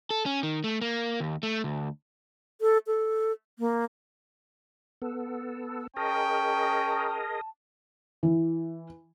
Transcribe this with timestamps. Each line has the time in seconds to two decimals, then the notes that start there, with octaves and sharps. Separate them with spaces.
0.11 A4
0.26 C#4
0.43 D#3
0.64 A3
0.81 A#3
1.20 D#2
1.43 A3
1.64 D2
2.61 A4
2.87 A4
3.59 A#3
5.02 B3 A4
5.97 C#4 G#4 A#4 D#5 G5 A5
8.23 E3